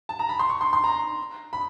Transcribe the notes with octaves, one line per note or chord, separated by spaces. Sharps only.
A5
A#5
B5
C6
C#6
C6
C6
A#5
B5